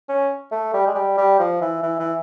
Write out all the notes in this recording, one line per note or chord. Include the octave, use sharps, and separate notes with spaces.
C#4
A3
G3
G#3
G3
G3
F3
E3
E3
E3